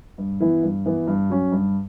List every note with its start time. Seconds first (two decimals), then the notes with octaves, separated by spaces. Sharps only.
0.18 G2
0.40 E3 B3 E4
0.63 G2
0.86 E3 B3 E4
1.07 G2
1.30 F#3 C#4
1.52 G2